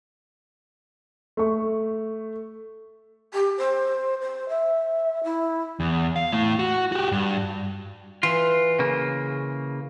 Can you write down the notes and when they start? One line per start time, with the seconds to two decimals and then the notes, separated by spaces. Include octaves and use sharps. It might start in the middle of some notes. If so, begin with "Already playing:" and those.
1.37 A3 C#6
3.33 G4
3.57 C5
4.20 C5
4.49 E5
5.23 E4
5.80 E2
6.16 F5
6.33 A3 E4
6.59 F#4
6.92 F#4 G4
7.12 G2
8.23 E3 F4
8.79 C#3 A#3